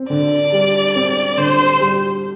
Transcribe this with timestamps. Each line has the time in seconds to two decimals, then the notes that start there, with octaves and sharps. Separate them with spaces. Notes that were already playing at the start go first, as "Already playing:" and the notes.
Already playing: C4
0.09 D3 D5
0.52 G3
0.95 C4
1.37 D3 C5
1.80 G3